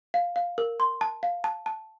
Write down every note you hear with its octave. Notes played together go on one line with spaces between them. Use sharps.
F5
F5
A#4
C6
A5
F5
A5
A5